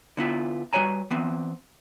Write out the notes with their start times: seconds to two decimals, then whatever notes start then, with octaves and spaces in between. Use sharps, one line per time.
0.17 D3 B3 E4 F4
0.73 G3 F#4 B4 C#5 G#5 A#5
1.10 E3 B3 C4